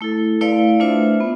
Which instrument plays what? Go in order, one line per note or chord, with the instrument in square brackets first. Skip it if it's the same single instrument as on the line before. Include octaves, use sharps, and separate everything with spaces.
[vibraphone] A3 E4 A4
A3 E4 B4 D5 F5
A3 D4 F4 C5 E5
B3